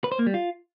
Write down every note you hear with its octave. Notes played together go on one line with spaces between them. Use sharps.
B4
C5
A#3
G3
F4